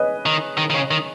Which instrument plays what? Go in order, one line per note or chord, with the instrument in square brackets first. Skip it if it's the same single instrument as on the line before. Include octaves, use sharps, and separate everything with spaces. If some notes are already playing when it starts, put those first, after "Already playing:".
Already playing: [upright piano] G#4 B4 C#5 D#5
[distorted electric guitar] D#3
D#3
D#3
C#3
D#3